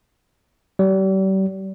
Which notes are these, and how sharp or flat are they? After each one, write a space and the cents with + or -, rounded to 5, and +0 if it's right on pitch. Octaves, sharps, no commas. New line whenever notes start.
G3 -40